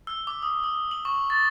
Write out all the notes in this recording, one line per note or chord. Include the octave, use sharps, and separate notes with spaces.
E6
D6
D#6
D#6
F#7
C#6
A6